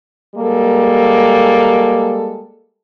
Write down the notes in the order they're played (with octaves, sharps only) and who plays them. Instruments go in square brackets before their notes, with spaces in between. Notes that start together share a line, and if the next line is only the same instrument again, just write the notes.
[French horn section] G3 G#3 A#3 A4